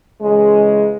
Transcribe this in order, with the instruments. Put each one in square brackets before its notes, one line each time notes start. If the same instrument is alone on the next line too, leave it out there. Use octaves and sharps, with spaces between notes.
[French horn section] C#3 E3 G#3